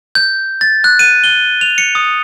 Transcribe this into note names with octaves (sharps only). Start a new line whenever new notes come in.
G6
A6
F#6
D#7
G7
F7
C#7
D#6